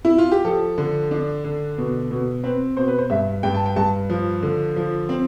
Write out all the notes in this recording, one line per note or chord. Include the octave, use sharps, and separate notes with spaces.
E4
F4
G4
F3 A4
D3
D4
D3
B2
B2
C4 B4
B2 C5
B4
C5
G2 E5
G2 G5
A5
G5
G2 A5
F3
D3
F3
C4